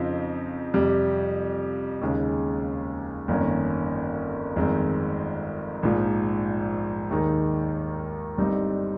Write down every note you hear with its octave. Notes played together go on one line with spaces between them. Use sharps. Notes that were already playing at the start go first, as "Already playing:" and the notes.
Already playing: F2 C#3 F3 C4 D#4
F2 C3 G3
D#2 C#3 G#3 D#4
G1 F2 D#3 A#3 C#4
G1 F2 D#3 G#3 C4
A#1 G#2 F3
D#2 D#3 G#3 D#4
G1 G2 G3 C4 D#4